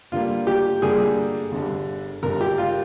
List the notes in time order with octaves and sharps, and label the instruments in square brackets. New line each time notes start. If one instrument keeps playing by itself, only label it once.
[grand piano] G2 D3 G3 A#3 [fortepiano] F4
[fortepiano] G4
[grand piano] G2 D3 G3 A#3 [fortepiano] G#4
[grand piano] G1 G2 D3
[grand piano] G1 G2 D3 [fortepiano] A#4
[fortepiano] G4
F4